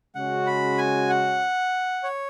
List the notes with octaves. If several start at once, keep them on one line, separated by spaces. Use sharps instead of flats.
C#3 G#3 C#4 F#4 F#5
B5
G#5
F#5
C#5